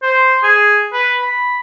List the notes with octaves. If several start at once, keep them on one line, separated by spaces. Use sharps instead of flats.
C5
G#4
B4
B5